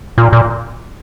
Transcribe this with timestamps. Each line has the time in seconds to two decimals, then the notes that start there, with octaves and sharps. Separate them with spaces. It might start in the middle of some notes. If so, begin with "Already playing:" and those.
0.18 A#2
0.33 A#2